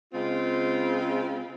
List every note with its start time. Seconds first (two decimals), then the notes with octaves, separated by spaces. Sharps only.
0.14 C#3 G#3 C4 F4